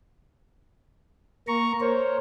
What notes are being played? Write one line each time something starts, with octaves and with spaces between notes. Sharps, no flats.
A#3 A#5 C#6
A#4 C5 C#5